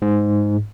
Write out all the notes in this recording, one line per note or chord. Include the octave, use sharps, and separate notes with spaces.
G#2